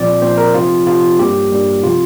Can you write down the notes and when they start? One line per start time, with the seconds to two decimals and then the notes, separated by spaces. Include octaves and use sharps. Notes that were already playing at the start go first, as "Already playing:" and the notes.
Already playing: A#2 F3 C4 D5
0.21 A#2 F3 C4 C5
0.37 A#4
0.54 C3 F3 C4 F4
0.87 C3 F3 C4 F4
1.19 G2 G3 A#3 G4
1.51 G2 G3 A#3
1.84 C3 F3 C4 F4